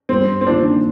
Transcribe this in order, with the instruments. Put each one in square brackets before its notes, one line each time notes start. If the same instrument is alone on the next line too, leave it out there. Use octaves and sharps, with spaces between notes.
[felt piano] G2 [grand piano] C4
[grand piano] C4
[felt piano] D#3 A#3 F4 C5 [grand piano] D4